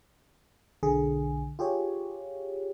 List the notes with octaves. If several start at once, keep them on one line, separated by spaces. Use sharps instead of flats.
B1 D3 G#4
F4 G4 G#4 C#5